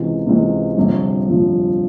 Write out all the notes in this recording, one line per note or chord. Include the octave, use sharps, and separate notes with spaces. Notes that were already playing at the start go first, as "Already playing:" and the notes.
Already playing: C#2 C3 E3
C#2 C3 E3
G1 F2 C3 F3
G1 F2 C3 F3